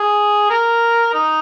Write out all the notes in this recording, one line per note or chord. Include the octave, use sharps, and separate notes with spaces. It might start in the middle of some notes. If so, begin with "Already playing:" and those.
Already playing: G#4
A#4
D#4